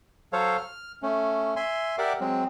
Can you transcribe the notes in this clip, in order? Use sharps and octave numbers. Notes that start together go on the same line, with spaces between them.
F#3 A4 C5 C#5 F5
F6
A3 C#4
E5 G#5 C6
G4 A#4 D5 E5 F#5 D6
F#3 G#3 C4